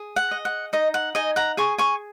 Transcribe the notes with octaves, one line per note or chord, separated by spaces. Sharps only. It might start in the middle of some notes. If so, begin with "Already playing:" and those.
Already playing: G#4
F#5
D#5
F#5
D#4 D#5
F#5
D#4 D#5 G#5
F#5 A#5
G#4 G#5 C#6
G#5 C#6